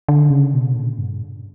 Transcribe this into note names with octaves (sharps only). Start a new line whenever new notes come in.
D3
C#3
B2
A#2
G2